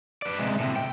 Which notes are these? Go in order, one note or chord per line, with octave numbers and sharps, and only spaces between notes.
B4 D5
C3 G#3
A2 C3
G5